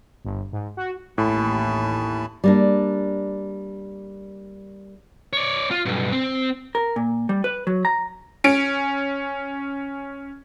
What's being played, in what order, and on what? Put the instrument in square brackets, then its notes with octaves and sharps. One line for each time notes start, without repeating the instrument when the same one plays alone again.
[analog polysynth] G1
G#2
F#4
[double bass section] A1 D#2 [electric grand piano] A2 [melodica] G#5 A5 B5
[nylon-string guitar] G3 A#3 D4
[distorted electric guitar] C#5 D5
F4
B1 G2
C4
[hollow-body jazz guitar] A#4
A#2
G3
B4
F#3
A#5
[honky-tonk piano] C#4 D7